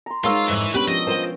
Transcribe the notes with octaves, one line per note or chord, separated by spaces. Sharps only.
A#5 C6
G#3 D#4 F4 A#4 C#5 F5 E6
F2 G#2 E3 A#5
B3 C#4 D4 G4 B4 G5 B5
F3 C#4 D#5
F4 A#4 C5 G5